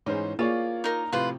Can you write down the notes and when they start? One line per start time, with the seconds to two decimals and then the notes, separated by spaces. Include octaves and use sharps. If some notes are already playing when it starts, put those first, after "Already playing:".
0.06 G#2 E3 C#4 D#4 G#4 C5
0.39 A#3 F4 G#4 C#5 D5
0.84 D#4 A#4 A#5
1.12 A2 C3 F3 F4 B4 C5